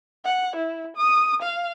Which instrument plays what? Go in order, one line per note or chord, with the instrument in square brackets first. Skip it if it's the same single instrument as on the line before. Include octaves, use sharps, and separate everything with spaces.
[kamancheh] F#5
E4
D#6
F5